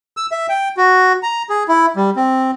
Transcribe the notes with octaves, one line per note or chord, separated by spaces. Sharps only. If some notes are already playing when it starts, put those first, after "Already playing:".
E6
E5
G5
F#4
A#5
G#4
E4
G3
C4